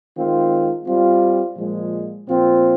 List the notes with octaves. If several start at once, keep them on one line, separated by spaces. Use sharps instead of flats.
D#3 G#3 C4 F4
G3 C4 F4
A#2 F3 G#3
A#2 F3 C4 F4